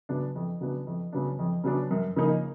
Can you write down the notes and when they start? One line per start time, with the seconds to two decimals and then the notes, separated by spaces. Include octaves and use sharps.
0.09 C#3 F#3 B3 D4
0.36 F2
0.61 C#3 F#3 B3 D4
0.87 F2
1.13 C#3 F#3 B3 D4
1.39 F2
1.64 C#3 F#3 B3 D4
1.91 F#2
2.16 C#3 F3 A#3 D#4